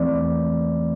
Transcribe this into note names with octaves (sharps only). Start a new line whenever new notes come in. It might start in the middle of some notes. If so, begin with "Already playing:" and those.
Already playing: E2 E3 A3 C4 D5